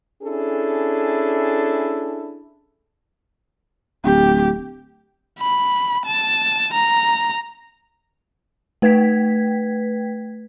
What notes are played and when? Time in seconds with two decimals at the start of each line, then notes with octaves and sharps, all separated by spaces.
0.23 C#4 D4 E4 G#4 A4
4.04 D1 G4
5.39 B5
6.06 A5
6.73 A#5
8.82 A3 B4 G5 G#6 B6